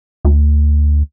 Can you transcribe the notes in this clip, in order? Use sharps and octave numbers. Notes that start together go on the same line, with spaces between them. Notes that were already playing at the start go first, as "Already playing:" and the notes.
D2